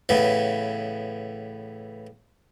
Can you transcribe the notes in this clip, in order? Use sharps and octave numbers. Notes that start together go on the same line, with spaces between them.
A2 C#3 E3 B3